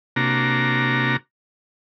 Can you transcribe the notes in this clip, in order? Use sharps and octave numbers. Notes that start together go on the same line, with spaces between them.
C3 A#3 D4 F#4 A#5